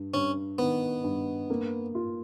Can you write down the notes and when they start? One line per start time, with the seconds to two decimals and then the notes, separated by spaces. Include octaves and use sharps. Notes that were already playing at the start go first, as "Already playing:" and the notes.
Already playing: G2
0.14 G2 C#4
0.58 D#3 B3
1.04 G2
1.50 A#3
1.95 F4